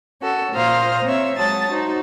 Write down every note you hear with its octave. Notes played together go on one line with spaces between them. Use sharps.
C#4 F#4 A4
A#2 C5 F5 A#5 D#6 F6
C4 C#5 E5
F#3 G#3 A5 D#6 A6
D#4 F#4 C5